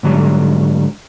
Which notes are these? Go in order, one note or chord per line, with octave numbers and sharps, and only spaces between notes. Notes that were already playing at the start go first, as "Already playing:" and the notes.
G#2 D3 F#3 G3